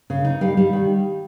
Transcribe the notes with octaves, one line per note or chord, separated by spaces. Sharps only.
C#3
D#4
G3 F5
G3
D#3